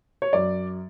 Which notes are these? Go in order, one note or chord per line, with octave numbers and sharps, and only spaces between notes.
C#5
F#2 D5